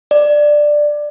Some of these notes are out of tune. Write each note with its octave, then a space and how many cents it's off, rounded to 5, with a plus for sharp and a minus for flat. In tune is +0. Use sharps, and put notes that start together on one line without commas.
D5 +10